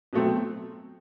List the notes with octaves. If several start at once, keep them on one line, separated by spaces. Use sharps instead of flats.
B2 F#3 A3 C4